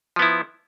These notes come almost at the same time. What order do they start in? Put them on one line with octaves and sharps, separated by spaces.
F3 B3 E4